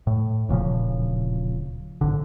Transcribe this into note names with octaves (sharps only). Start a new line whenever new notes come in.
A2
D1 A#2 C#3 F3
G#1 D3